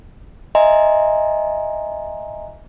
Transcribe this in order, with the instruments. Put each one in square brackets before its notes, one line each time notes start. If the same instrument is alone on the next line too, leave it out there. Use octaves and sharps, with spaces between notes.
[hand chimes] D#5 E5 G#5 A#5 C6